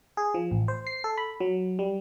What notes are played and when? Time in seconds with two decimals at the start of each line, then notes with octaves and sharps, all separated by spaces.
0.17 G#4
0.34 F3
0.51 A1
0.68 C5
0.87 C7
1.04 A4
1.18 B5
1.40 F#3
1.79 G3